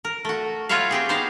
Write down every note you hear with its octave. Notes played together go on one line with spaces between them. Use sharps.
A#4
A3 F#4
F4 F#4 B4 C#5 E5 F5
C4 G4 G#4
B3 D#4 C5 F5